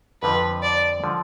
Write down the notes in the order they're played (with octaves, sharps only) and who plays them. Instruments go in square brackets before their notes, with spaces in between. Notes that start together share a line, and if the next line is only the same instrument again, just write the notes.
[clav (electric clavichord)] F2 D3 F3 [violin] B4
[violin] D5
[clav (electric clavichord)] D3 F3